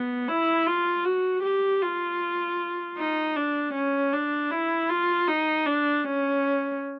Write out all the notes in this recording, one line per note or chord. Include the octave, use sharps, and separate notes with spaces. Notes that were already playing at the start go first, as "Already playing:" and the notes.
Already playing: B3
E4
F4
F#4
G4
F4
D#4
D4
C#4
D4
E4
F4
D#4
D4
C#4